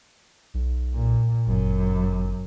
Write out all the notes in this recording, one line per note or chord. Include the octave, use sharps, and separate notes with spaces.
B1
A#2
G1 F#2